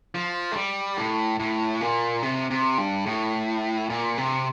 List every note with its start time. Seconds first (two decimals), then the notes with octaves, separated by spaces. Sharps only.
0.15 F3
0.52 A3
0.56 G3
0.97 A2
1.40 A2
1.81 A#2
2.23 C3
2.50 C3
2.78 G2
3.06 A2
3.90 A#2
4.18 C3